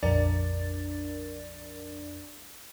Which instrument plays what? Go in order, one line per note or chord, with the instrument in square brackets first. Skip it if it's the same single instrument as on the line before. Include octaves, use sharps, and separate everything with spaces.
[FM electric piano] A#1 F2 D4 A#4 D5 A6